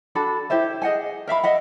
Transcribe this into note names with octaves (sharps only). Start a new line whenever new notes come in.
D4 F#4 A4 B5
E4 G4 C5 E5
G#4 D#5 F#5 G#5
A#4 E5 F5 B5
D#5 E5 F#5